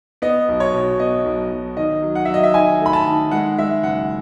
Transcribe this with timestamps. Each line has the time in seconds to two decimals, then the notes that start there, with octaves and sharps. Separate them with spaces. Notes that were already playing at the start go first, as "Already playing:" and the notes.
0.22 B3 D#5
0.48 B1
0.60 C#5
0.74 B2
1.00 B3 D#5
1.25 B1
1.51 B1
1.77 D#3 D#5
2.02 F#3
2.15 F#5
2.25 F#3 E5
2.34 D#5
2.43 E5
2.54 D#3 G#5
2.80 A3
2.86 B5
2.93 A5
3.07 D#3
3.31 G#3 F#5
3.58 G#3 E5
3.83 F#1 F#5